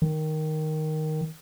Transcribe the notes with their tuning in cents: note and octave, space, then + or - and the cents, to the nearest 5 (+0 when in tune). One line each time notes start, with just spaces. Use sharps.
D#3 +0